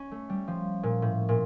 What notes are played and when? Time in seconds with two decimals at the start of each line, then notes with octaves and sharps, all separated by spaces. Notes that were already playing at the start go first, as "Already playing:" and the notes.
Already playing: C#4
0.11 A3
0.29 G3
0.48 F3
0.83 A#2
1.02 A2
1.29 A#2